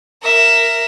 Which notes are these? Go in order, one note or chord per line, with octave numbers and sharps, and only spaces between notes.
A#4 E5